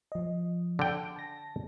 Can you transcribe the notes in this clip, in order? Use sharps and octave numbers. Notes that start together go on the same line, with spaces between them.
F3 D#5
D3 G5
A5 A#6